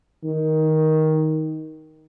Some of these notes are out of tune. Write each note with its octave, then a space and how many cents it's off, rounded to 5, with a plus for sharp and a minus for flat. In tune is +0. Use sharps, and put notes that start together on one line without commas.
D#3 +10